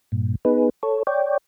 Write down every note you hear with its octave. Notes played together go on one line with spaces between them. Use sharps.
G2 A#2
B3 D#4 G#4 B4
A4 C#5
C#5 D5 G5